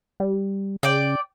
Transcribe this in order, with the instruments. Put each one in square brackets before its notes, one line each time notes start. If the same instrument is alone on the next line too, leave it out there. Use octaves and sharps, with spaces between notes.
[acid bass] G3
[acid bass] C#3 [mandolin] D5 G5